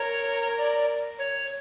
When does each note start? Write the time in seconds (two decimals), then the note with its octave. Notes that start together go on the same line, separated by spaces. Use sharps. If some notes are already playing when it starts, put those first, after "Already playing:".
Already playing: A#4 C#5
0.57 D5
1.19 C#5